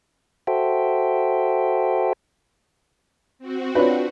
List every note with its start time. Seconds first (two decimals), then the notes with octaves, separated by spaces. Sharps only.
0.47 F#4 A4 C5 E5 G5
3.39 C4 F#4
3.75 D4 F4 B4 C#5